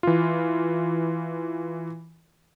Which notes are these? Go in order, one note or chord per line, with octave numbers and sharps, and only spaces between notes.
E3 F4